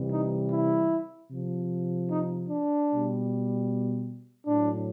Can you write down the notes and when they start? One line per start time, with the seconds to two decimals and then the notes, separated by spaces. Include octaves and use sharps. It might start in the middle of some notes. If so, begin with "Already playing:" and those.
Already playing: C3 E3 G3
0.11 D#4
0.51 E4
1.30 C3 F3
2.09 D#4
2.49 D4
2.89 B2 G3
4.47 A2 F#3 D4